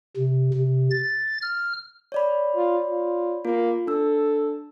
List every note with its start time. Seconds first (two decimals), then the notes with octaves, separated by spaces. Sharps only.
0.17 C3
0.54 C3
0.91 A6
1.42 F6
2.12 C#5 D5 B5
2.56 F4
2.88 F4
3.45 A#3 F4
3.87 D4 A4 E6